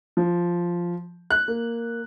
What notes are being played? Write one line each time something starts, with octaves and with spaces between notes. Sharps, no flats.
F3
F#6
A#3